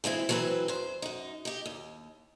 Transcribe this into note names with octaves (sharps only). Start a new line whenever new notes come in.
E3 G#3 C4 E4
E3 F#3 C4 G#4 B4
E2 C5
F#2 D#4
D#4 G4
D#2